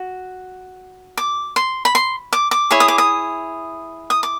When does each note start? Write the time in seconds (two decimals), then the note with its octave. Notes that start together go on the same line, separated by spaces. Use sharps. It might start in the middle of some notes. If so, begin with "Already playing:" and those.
Already playing: F#4
1.17 D6
1.56 C6
1.85 B5
1.95 C6
2.33 D6
2.51 D6
2.71 E4 G#4 C#5
2.80 D#6
2.88 D6
2.98 D#6
4.10 D#6
4.23 D6